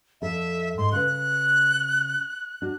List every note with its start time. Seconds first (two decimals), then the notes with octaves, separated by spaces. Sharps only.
0.22 F2 A4 E5
0.78 G#2 C6
0.93 C#3 B4 F#6
2.62 D4 F#4